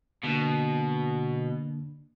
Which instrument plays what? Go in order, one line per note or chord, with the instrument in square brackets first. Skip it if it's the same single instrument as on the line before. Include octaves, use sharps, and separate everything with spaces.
[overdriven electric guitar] B2 [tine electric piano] D3 A#3 D4